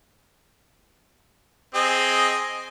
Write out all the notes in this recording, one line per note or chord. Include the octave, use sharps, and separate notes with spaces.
C4 G#4 D#5